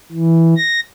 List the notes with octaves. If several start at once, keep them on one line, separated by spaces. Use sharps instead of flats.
E3
A#6